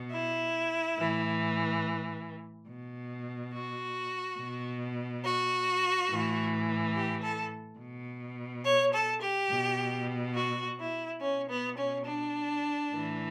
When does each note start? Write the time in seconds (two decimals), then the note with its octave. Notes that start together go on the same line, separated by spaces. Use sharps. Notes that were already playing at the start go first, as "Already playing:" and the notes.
Already playing: B2
0.10 E4
0.96 A2 E3
2.66 B2
3.52 F#4
4.38 B2
5.23 F#4
6.08 A2 E3
6.94 G4
7.22 A4
7.78 B2
8.64 C#5
8.93 A4
9.21 G4
9.50 B2
10.34 F#4
10.78 E4
11.20 B2 C#4
11.48 B3
11.77 C#4
12.05 D4
12.90 A2 E3